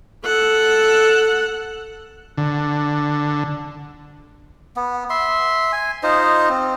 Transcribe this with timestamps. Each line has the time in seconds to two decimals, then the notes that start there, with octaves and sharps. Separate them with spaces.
0.25 A4 F#5
2.38 D3
4.76 B3
5.10 E5 C6
5.72 G#5
6.03 D#4 F4 C5 D#5
6.49 C4